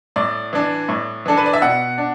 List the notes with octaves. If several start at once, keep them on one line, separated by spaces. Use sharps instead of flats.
A2 D5
E3 D4
A2
E3 D4 A4
B4
D5
E5
B2 F#5
D4